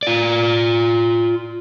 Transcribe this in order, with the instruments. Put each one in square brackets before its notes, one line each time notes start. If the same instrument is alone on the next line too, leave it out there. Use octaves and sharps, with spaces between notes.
[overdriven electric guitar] F4 D5